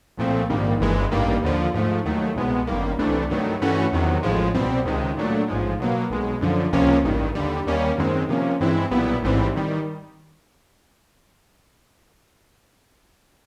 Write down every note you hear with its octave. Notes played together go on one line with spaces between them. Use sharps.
C2 A#2 F3 A3 C4
A#1 G#2 D#3 G3 A#3
G1 G2 E3 G#3
A1 G2 D#3 G3 A#3
D#2 D3 F3
G#2 F3 A3
D#2 D#3 F#3 A3
C2 B2 G#3 B3
G1 F#2 D#3 G3 A#3
C2 C3 E3 A3 D4
G2 D#3 F#3 A3
G2 E3 A3 C#4 F#4
E2 C3 D#3 F#3
A1 A2 F3 G#3
C2 B2 G3 C4
C#2 C3 D#3 G#3
A#2 F#3 A3 D4
A1 G#2 F3 G#3
B2 F#3 A#3
B1 B2 G#3
F#2 D3 F3
C#2 C3 F3 A#3 C#4
A1 G2 D#3
D#2 D3 G3
D#2 D#3 G3 A#3 C#4
F#2 D#3 G#3 C4
C3 F3 A#3 C#4
G2 E3 G#3 C4 E4
B1 A#2 G3 B3 E4
A1 G#2 E3 G3 C4
D#3 G3